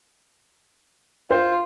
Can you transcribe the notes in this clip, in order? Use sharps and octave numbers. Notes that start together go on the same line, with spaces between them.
F4 C5